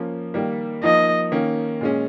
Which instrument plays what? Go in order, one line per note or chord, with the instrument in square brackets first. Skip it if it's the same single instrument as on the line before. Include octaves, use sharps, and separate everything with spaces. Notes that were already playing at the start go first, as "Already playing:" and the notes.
Already playing: [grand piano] F3 A#3 C#4
D#3 G3 A#3
[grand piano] F3 A#3 D#4 [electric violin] D#5
[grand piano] D#3 A#3 C#4
A#2 G#3 C#4